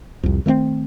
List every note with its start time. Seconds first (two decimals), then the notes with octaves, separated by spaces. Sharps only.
0.23 C2 F2
0.46 D#3 A3 A#3 C4